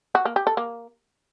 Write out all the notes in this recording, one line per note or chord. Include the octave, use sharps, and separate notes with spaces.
F#4
A#3
G4
A4
A#3